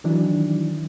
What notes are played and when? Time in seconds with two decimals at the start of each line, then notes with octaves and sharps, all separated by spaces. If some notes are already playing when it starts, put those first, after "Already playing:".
0.04 D#3 E3 F#3 D4 E4